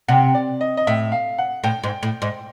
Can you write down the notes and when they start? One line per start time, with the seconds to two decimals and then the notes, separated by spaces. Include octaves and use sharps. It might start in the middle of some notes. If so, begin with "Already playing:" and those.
0.08 C3 F#5
0.34 D5
0.61 D#5
0.77 D#5
0.87 A2 E5
1.12 F5
1.38 F#5
1.64 A2 G5
1.83 G#2
2.03 A2
2.22 G#2